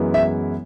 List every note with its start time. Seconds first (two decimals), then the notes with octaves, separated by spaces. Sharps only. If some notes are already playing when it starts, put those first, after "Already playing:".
Already playing: F#2 E3 G#3 B3 E4
0.14 E5